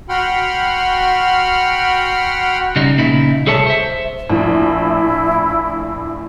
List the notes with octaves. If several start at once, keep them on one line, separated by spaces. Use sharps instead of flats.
F#4 F#5 G5 B5 C6 F6
C#3 G3 D#4
A#2 C#3 D#4 E4
C2 G#4 A4 C#5 E5 A5
C5 E5
A#1 A2 E4